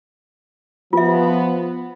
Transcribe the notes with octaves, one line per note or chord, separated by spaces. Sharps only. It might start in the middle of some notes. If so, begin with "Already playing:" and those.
F3 B3 F4 E5